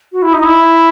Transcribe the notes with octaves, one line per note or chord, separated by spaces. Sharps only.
F#4
E4
D#4
E4